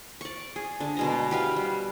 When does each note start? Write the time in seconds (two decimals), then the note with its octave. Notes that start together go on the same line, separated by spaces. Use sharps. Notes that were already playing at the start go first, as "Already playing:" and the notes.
0.21 D5 C#6
0.56 G#4
0.80 D3 D4
0.97 B2 G#3 A#5
1.31 G4 B4 F5
1.56 G3